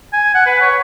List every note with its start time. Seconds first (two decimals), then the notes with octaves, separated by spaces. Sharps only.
0.13 G#5
0.35 F#5
0.46 B4
0.61 C#5